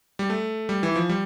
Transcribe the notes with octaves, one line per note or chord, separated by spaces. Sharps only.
G3
A3
G3
E3
F3
G3